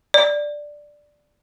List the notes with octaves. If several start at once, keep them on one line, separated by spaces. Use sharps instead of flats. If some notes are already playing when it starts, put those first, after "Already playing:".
D5